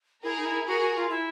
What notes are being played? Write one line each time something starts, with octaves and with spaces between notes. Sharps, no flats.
E4 G#4 A#4
D#4
E4
F#4 G#4 A#4
F#4
F4
E4